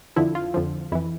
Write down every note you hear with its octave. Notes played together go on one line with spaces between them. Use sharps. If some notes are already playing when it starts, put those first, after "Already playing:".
F2 D3 F3 E4
F4
F2 D3 F3
F2 E3 E4